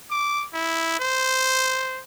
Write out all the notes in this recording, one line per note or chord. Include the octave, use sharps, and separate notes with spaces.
D6
E4
C5